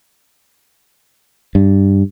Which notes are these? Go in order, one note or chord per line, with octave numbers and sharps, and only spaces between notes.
G2